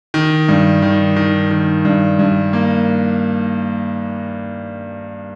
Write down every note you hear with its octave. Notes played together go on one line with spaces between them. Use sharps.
D#3
G2
D#3
D#3
D#3
G2
G2
A#3